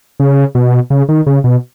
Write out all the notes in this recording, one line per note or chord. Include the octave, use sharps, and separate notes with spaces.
C#3
B2
C#3
D#3
C#3
B2